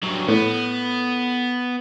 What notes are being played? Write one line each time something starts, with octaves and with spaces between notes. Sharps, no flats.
G2 F#3
A2 B3